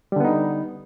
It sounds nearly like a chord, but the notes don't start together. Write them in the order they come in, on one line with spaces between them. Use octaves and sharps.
G3 D3 B3 D#4